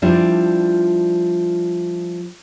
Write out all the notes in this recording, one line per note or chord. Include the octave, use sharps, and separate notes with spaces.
F3 G3 D4 E4